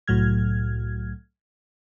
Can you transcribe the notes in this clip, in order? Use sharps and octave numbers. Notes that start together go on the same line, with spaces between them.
C2 A2 F#3 F6 G#6